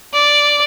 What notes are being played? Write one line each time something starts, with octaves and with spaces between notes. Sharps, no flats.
D5